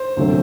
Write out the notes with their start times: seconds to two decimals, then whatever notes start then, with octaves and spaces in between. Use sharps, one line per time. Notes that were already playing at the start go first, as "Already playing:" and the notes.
Already playing: C5
0.17 D2 C3 F#3 A3